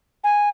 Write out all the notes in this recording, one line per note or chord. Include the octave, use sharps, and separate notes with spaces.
G#5